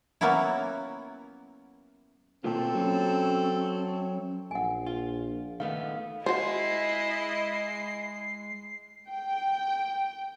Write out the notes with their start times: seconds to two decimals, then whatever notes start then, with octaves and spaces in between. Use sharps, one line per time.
0.21 F#3 A#3 B3 C#4 E4
2.44 B2 A#3 C4 F4 A4
2.74 F#3 C#4
4.51 A#1 F#5 G#5
4.86 F4
5.60 D#3 A3 B3 F5
6.26 G#3 E4 F#4 G#4 C5 D#5 C7
9.09 G5